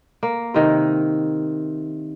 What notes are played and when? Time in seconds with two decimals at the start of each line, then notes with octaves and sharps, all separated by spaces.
0.23 A#3
0.54 C3 D#3